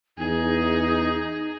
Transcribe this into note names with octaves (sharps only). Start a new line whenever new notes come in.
E2 D#4 G#4